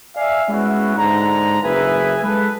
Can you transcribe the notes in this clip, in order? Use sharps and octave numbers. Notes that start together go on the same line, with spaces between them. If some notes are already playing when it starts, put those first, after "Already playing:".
D5 E5 F5 G#5
G#3 B3 C#4 E4 F#4
G#2 D3 A#5
F#1 G#4 B4 E5 G#5
G#3 A4 B4